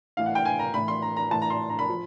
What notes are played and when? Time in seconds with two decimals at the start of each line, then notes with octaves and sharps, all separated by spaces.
0.17 A2 E3 F5
0.26 F#5
0.35 G5
0.45 G#5
0.59 A#5
0.74 A2 E3 B5
0.88 C6
1.02 A#5
1.17 A#5
1.31 A2 E3 A5
1.42 A#5
1.50 C6
1.70 A#5
1.79 B5
1.89 F3